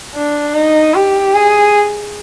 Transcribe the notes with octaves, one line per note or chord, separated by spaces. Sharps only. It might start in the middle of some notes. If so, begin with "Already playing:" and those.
D4
D#4
G4
G#4